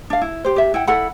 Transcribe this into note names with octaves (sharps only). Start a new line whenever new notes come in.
D4 F5
E4
G4 C5
G4 E5
E4 F#5 G5
E4 A4 F#5 B5